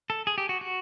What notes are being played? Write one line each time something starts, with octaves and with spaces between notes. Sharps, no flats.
A4
G#4
G4
F#4
F#4